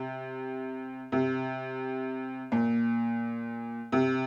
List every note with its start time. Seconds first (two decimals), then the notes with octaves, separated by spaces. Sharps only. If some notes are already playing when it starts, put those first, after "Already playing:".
Already playing: C3
1.12 C3
2.52 A#2
3.92 C3